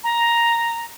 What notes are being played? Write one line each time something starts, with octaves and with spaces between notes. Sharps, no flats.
A#5